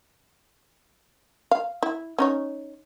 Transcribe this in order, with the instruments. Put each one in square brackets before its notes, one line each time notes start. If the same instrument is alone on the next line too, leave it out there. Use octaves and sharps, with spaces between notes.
[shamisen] F5
E4
C#4 D#4 C#5